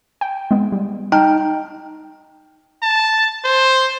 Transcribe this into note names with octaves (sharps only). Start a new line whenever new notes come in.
G5
G#3 B3
G3
D#4 G5 A5 F6
A5
C5